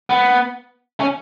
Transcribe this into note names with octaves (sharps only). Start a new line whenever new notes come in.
B3
C#4